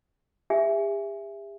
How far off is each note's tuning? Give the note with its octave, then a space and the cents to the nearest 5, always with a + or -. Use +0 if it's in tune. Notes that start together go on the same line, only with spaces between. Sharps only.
G4 +45 E5 +10 G#5 +0